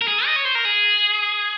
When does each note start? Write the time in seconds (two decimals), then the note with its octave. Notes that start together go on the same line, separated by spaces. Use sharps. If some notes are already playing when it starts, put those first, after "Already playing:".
0.01 A#4
0.08 G#4
0.26 D#5
0.36 C#5
0.45 C5
0.55 A#4
0.65 G#4